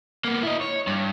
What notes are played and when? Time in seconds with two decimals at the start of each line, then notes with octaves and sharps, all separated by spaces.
0.24 A#3 B3
0.43 E4 D#5
0.61 C#5
0.87 G2